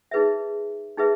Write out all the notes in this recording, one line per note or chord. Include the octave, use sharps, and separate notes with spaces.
D#4 G#4 B4 E5
D#4 G#4 B4 E5